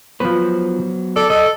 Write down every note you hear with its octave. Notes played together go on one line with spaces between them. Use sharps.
F3 F#3 B3 B4 C5
A4 D5
A4 D#5